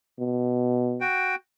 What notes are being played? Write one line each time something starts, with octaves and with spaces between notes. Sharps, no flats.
B2
F#4 G5